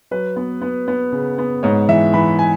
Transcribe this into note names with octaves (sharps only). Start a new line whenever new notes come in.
F#3 B4
B3
B3
B3
C#3
B3
G#2 C#5
E3 E5
E3 B5
G#5